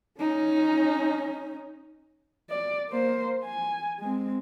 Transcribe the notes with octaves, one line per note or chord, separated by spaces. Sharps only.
C#4 D#4
D5
A#3 C5
G#5
G#3 C4